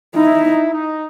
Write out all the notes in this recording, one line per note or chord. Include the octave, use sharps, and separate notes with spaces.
D#4 E4
D#4